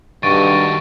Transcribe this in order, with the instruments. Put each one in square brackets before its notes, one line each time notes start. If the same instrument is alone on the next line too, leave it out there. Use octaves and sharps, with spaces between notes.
[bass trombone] G2 [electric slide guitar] D#3 F#4 A4 [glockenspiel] C#6 [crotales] A6 D7 D#7